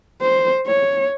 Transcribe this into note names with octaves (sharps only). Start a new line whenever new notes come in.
C5
C#5